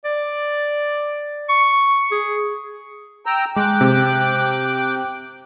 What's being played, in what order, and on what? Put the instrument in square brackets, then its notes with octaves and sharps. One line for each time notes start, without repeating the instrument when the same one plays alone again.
[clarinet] D5
C#6
G#4
[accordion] G5 A#5 E6
[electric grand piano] G#3 [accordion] G5 D6 F#6
[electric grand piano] C3